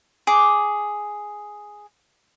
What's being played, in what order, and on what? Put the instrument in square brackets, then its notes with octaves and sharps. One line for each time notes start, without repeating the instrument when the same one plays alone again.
[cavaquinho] G#4 D6